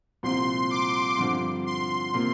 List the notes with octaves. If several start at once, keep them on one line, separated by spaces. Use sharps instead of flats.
C2 A#2 F3 C4 C6
D6
G2 D3 F3 C4
C6
C3 A#3 F4